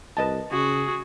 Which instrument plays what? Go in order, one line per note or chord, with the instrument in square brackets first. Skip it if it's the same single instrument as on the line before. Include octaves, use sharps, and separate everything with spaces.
[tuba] C2 [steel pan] B4 D#5 A5
[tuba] C#3 [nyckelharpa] F#4 [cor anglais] G#4